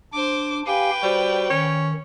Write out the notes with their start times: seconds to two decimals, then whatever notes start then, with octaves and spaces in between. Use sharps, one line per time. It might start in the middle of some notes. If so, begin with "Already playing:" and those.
0.13 D4 C5 D6
0.67 G4 B4 F5 G5 G#5
1.03 G3 F#4 C5
1.50 D#3 C#4